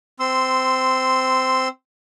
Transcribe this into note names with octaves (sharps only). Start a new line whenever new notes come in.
C4 C6 E6